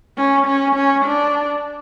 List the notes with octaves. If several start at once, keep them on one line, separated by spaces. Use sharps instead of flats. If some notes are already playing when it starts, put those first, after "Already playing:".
C#4
C#4
C#4
D4